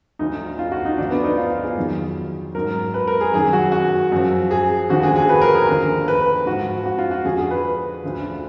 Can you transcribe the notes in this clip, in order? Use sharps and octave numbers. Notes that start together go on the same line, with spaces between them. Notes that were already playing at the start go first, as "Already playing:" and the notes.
D2 D3 F3 D#4
F4
F#4
D#4
D2 D3 F3 D4
B3
D#4
F4
F4
G#4
F2 D#3 F#3
G#2 F#3 A#4
B4
A#4
G#4
F#2 D#3 F#3 G#4
F#4
F#4
F#2 F3
G#4
D#2 D3 F3 F#4
G#4
G#4
B4
A#4
G#4
D#2 D3 F3 A#4
B4
G#2 F3 F#4
F#4
F4
F#4
F2 D3 F3 G#4
G#4
B4
D2 D3 F3